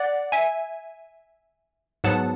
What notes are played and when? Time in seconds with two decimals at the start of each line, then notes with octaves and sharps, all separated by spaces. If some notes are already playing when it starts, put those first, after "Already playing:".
Already playing: D5 F#5
0.32 E5 G#5
2.04 G#2 F#3 B3 F#5 A5